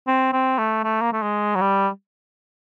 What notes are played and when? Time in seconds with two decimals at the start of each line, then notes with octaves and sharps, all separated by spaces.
0.07 C4
0.33 C4
0.58 A3
0.83 A3
1.01 A#3
1.12 A3
1.22 G#3
1.55 F#3
1.61 G3